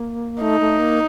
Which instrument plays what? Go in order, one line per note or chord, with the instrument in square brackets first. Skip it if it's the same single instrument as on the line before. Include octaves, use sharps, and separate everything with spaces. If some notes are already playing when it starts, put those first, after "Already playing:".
Already playing: [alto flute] A#3
[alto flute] A3 [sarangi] D#4
[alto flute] A3
A#3